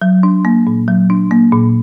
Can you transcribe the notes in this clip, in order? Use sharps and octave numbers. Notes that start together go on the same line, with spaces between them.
F#3
D4
A#3
A#2
F#3
D4
A#3
A#2